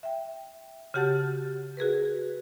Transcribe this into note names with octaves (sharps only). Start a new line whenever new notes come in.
E5 G5
C#3 F#4 G4 F#5 A5 A6
F#4 G#4 A#4 B4